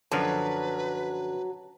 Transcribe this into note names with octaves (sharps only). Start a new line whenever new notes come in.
F#2 D3 F3 F#3 B4 A5